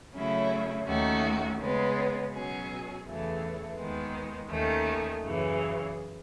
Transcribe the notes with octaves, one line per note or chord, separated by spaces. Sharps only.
C#3 F#3 A3 C#4 E4
D#2 D#3 A3 C#4 F#4
C#3 G#3 B3
B2 F#3 C#4 G#4
E2 C#3 E3 A3
D#2 D#3 G#3 B3
D#2 D#3 A3 C#4
F#2 C#3 E3